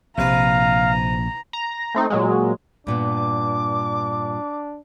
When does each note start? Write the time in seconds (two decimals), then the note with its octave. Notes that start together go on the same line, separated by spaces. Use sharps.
0.18 A#1 C3 B4 F5 A#5
1.53 A#5
1.94 A3 C4 D#4
2.10 A#2 F#3 G#3
2.87 G2 A#2 B3 D4 D6